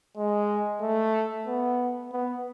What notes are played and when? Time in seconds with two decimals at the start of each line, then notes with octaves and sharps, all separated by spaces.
0.17 G#3
0.81 A3
1.46 B3
2.12 B3